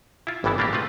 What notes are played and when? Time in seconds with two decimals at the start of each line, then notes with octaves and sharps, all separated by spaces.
0.27 E4 F4
0.44 G#1 G2 E3 B3 E4 A5
0.58 A3 A#3 D4 F#4 G4
0.73 A3 C4 F4 B4